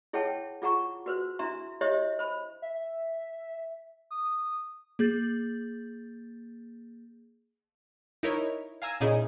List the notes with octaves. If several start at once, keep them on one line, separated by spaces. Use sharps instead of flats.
E4 G#4 C#5 F#5 G5 A5
F4 G#4 F#5 A#5 C#6
F#4 B4 C5
D4 E4 E5 A#5 C6
E4 G4 C5 C#5 D#5 E5
C5 B5
E5
D#6
A#3 G#4 G6 A6
D#4 E4 A#4 C#5
F5 G#5 A#5 E6 G#6 D#7
A#2 C#3 D#4 E4 G#4